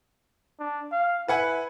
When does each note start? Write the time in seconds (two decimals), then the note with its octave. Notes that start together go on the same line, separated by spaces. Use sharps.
0.59 D4
0.92 F5
1.28 E4 B4 F#5 G#5